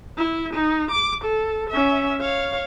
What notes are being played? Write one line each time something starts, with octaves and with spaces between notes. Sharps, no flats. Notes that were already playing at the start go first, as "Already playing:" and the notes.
E4
D#4
D6
A4
C#4 E5
C#5 F5